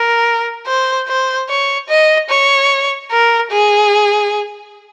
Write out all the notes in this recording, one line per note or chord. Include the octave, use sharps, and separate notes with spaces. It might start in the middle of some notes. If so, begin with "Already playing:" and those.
Already playing: A#4
C5
C5
C#5
D#5
C#5
A#4
G#4